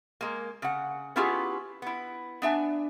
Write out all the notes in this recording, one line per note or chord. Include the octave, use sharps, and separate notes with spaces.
G#3 A#3
C#3 F#5
B3 C#4 E4 F4 G4 G#4
B3 E4
B3 D4 E5 G#5